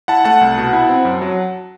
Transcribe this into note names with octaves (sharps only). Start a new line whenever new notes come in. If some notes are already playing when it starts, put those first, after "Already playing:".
E4 F#5 A5
A3 F#5 A5
C2
B2
E4
C4
F#2
F#3